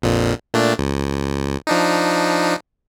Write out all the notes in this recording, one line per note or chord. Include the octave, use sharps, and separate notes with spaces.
A#1 F2 A#2
A#2 A3 D4
C#2
F3 D4 D#4